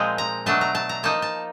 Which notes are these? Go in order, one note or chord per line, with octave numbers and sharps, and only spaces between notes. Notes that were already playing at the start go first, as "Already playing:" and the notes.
Already playing: A#2 F3 G#3 C4 D#4
A#5
B2 F#3 A3 D4 A5
A#5
A5
A#5
F3 A#3 D#4 A5
A5